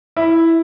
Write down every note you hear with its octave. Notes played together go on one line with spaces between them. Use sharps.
E4